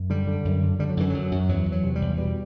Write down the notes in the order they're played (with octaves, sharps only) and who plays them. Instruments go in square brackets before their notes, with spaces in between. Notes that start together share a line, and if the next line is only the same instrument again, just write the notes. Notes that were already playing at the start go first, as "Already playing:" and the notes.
Already playing: [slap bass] F#2
D3 G3
D3
F#2
D3
D3 G3
F#3
F#2 E3
F#2 F#3
F#2
E2 F#3
E2
F#3
C3
G3
E2
B2 G3